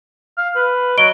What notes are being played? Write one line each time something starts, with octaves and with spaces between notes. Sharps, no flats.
F5
B4
F#3 D#5 D7 G7